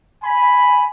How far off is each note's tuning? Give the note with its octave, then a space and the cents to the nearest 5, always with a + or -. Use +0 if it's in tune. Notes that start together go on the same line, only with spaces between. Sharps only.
G#5 +0 B5 +0